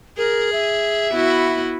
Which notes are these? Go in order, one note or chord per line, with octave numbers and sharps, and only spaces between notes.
G#4 A#4
E5
B3 E4 F#4